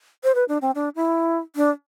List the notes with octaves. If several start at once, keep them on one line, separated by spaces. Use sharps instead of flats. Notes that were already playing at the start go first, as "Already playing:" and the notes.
C5
B4
D4
C4
D4
E4
D4